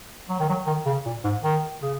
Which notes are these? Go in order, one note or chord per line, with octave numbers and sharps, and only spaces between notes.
F#3
D#3
F#3
D#3
C#3
A#2
G#2
D#3
C#3